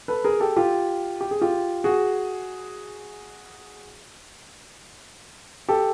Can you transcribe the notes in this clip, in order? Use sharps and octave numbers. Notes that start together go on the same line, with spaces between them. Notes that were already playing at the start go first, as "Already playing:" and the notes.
A4 B4
G#4 A#4
G4 A4
F4 G4
G4
G#4
F4 G4
F#4 G#4
G4 A4